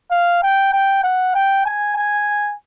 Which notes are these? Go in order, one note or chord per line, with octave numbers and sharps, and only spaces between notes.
F5
G5
G5
F#5
G5
G#5
G#5